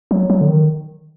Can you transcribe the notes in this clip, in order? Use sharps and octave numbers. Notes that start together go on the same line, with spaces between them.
F#3
F#3
D3
D#3